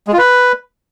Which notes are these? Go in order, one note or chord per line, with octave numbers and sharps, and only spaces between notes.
G#3
F4
B4